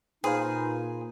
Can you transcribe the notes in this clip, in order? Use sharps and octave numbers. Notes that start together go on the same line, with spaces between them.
A#2 D#4 G#4 B4 C5 F5